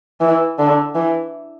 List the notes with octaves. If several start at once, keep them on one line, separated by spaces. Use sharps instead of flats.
E3
D3
E3